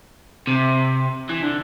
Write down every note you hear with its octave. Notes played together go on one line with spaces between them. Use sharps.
C3
E3
D3